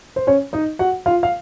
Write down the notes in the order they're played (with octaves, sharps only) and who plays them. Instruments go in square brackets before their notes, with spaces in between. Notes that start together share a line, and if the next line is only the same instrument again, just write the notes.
[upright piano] C5
C#4 C#5
D#4 D#5
F#4 F#5
F4 F5
F5